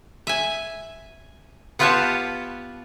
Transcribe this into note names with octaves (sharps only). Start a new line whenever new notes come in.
E5 G#5
B3 F4 G4 B4 C#5 A5